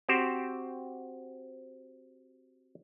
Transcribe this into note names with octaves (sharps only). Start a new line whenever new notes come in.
C4 F#4 G4 C5